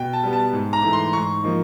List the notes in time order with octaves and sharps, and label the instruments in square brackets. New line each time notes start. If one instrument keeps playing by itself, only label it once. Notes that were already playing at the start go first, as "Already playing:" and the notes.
Already playing: [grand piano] B2 G5
A5
G3 B3
A5
G#2
A#5
E3 A3
C6
G#2 C#6
F3 A#3 D#4